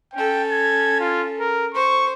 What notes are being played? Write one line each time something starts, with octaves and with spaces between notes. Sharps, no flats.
C#4 A4 G5
G#6
F4
A#4
C5 C#6